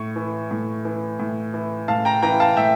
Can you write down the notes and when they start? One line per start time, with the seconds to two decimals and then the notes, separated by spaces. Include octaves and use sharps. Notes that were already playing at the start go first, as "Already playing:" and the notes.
Already playing: A2 C#6
0.16 E3
0.51 A2
0.85 E3
1.19 A2
1.54 E3
1.88 A2 F5 A5
2.05 G5 A#5
2.23 E3 G5 A#5
2.40 F5 A5
2.57 A2 E5 G5